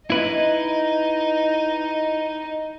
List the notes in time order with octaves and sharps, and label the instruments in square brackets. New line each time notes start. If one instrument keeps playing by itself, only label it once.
[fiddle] D#4 D#5 [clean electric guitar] E4 B4